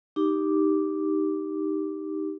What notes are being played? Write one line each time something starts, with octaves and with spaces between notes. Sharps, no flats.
D#4 G4 D6